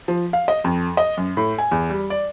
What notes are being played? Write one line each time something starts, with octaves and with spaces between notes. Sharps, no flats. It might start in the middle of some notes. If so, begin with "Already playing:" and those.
F3
F5
D#5
F2
D#5
F#2
A2
G#5
E2
G3
D5